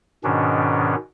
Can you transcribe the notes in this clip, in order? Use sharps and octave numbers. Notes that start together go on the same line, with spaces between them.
G#2 B2 D#3 C#4 D4